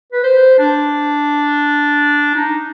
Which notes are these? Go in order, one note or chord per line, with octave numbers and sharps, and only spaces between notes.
B4
C5
D4
D#4